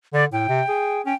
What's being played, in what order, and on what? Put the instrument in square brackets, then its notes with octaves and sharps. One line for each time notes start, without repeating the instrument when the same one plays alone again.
[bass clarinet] D3 [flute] D5
[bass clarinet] A2 [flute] G5
[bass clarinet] C3
G#4
[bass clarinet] C#4 [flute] G5